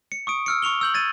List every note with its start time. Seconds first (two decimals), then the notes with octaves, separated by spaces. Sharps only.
0.12 C#7
0.27 C#6 D#6 D7
0.46 E6 F6 C#7
0.62 C#6 C#7 F7 G7
0.81 E6 G6 F#7
0.94 G#6 A6 D#7